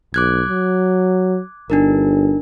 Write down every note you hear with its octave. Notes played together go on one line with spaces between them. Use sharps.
B1 D6 F#6 G#6
F#3
G1 D4 D#4 A#4